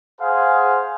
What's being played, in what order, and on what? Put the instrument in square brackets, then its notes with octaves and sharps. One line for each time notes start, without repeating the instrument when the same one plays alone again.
[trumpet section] G#4 C5 F5 F#5